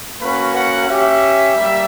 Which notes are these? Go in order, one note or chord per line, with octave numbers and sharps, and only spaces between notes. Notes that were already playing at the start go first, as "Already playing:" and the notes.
A#3 C#4 F#4 B4
F#5
C#4 G4 E5
G3 A#3